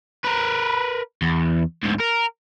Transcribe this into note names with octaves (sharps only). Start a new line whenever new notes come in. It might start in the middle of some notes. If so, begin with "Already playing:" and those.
A#4 B4
E2
D2 G#2
A#4